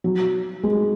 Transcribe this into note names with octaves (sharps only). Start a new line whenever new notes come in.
F#3
G#3